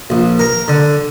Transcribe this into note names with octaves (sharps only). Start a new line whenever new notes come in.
A#1
A#4
D3